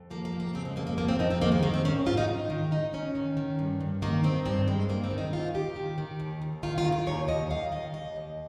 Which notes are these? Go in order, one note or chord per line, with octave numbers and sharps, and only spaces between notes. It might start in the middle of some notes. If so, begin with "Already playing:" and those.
Already playing: F2
F3 A#3
A#3
F2
A#3
C#3 C4
G#3
F2 A#3
A#3
F3 A#3
C4
F2 D#4
C4
D#3 A#3
G#3
D#3 A#3
C4
G#2 C#4
G#2 F4
D#4
D#3
D#3
G#2 D#4
G#2 C#4
D#3
D#3
G2
G2
D#3 A#3
D#3 C4
G2 C4
G2 G#3
D#3 A#3
C4
D#3
D#4
D#2 F4
D#2 G4
D#3
D#3
D#2
D#2
D#3 F4
F4
D#3
A#4
D#2 C#5
D#2 D#5
D#3 F5
D#3 D#5
D#2 D#5
D#2